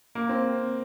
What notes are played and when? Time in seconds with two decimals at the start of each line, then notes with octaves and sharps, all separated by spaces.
0.15 A#3
0.29 C4